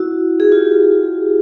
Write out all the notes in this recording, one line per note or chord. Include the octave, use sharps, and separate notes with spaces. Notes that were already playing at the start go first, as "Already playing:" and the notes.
Already playing: E4 F#4
G#4
F4 G4